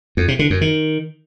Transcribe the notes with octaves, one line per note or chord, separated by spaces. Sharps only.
F2
C3
D3
F#2
D#3